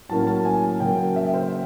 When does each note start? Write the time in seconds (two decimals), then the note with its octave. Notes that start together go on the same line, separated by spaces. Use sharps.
0.09 A2 F#3 A#3 C#4 A5
0.27 A5
0.45 G#5
0.80 C#3 F#3 A#3 G5
1.16 E5
1.34 C5